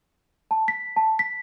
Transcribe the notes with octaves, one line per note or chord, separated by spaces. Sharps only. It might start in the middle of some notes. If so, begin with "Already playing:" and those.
A5
B6
A5
B6